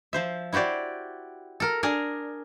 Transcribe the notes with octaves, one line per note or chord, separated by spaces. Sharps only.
F3 C5 E5
E4 F#4 G4 C5 D5
A4 A#4
D4 G#4 A#4